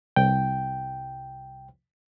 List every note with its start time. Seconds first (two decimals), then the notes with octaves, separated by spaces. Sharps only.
0.16 C2 G5